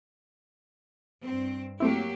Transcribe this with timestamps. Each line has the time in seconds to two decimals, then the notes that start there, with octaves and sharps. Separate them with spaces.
1.25 G2 C4
1.80 F#3 A3 A#3 C4 E4 G4